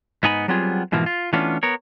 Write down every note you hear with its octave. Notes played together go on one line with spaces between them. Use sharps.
G#2 B3 D#4 G#5 B5
F#3 G3 B3 C4 F4 G#4
G#2 B2 E3 F3 A#3
F4
E3 A3 B3 C#4 D4 F4
B3 A#4 C#5